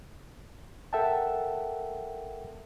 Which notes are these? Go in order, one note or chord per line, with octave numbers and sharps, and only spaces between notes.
A4 A#4 E5 F#5 G5 A5